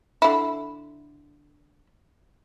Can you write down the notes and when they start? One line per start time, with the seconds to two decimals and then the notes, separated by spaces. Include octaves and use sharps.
0.22 D3 E4